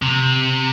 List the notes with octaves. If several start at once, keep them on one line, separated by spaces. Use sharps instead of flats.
C3